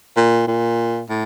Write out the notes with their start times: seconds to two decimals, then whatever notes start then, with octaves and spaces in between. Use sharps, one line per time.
0.16 A#2
0.47 A#2
1.10 A2